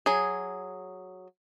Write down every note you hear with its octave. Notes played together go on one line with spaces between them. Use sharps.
F#3 G#4